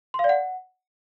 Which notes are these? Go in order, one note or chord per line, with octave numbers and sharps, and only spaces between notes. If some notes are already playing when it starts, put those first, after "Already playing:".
C6
F5
D5
F#5